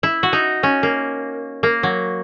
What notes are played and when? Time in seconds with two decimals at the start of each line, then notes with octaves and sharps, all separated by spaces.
0.03 E4
0.23 F#4
0.33 D#4
0.63 C#4
0.83 A#3
1.63 A#3
1.83 F#3